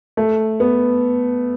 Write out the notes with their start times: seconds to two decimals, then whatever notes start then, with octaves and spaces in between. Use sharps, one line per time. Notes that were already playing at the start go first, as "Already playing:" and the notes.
0.17 A3
0.60 B3